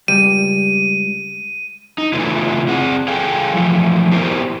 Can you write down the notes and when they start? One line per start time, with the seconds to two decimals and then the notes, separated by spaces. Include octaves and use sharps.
0.08 C#2 G3 D#7
1.98 D#4
2.13 C#3 E3 A3 B3 E4 F4
2.68 C4 G#4 F#5
3.08 G#4 A4 F5 G5
3.53 E3 F3 A3
4.12 B3 E4 G4 A#4 C5